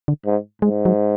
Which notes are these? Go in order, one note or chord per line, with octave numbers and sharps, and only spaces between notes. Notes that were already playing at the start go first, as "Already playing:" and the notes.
D3
G#2
G#2 G#3
F#3